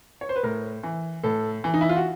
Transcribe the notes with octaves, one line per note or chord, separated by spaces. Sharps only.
C#5
C5
B4
A2 A#4
E3
A2 A4
E3
D#4
E4
F4
F#4